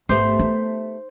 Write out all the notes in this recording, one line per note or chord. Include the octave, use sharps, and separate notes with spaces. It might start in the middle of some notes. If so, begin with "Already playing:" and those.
G#1 A3 B3 G4 C5
D#4